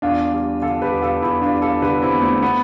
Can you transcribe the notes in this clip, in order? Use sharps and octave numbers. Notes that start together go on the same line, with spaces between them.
E2 D4 F4
G3
D3 F4 A4
G4 B4
E2
F4 A4
E2 E4 G4
D4 F4
G3
F4 A4
D3 G4 B4
C4 E4
E2
A3 C4
B3